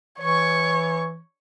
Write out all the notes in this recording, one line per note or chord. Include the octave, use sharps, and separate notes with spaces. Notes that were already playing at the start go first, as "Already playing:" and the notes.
E3 C#5 C#6